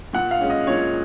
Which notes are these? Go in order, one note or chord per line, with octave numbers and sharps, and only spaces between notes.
A#2 F#5
F5
G#3 C#4
D#5
A#2 C#5